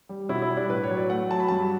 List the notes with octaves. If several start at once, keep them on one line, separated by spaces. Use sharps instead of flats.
G3
B2 E4
E4
G3
D4
A2 B4
C#5
F#3
D5
A3 F#5
F#3 A5
B5
G2 A5